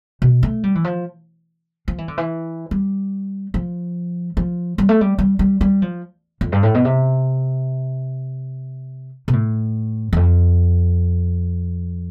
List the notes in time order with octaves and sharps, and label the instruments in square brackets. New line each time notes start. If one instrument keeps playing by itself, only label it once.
[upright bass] B2
A3
G3
E3
F3
F3
E3
D3
E3
G3
F3
F3
G3
A3
G3
G3
G3
G3
F3
F2
G2
A2
B2
C3
B2
A2
E2
F2